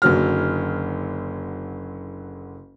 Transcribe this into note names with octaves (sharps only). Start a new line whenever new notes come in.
F#1 D3 F#3 F6